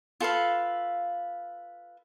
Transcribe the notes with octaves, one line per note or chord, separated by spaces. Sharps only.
F4 A4 B4 F5